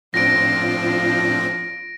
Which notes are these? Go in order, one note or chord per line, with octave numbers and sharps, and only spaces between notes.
A2 F3 C4 D4 F4 A#6 D7